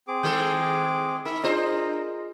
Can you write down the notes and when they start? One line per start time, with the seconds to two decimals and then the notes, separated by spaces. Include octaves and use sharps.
0.08 C4 G#4 D6
0.23 D#3 G#3 A4 G6
1.25 D#4 A#4 B5 E6
1.44 D4 F4 G#4 A#4 C5 D#5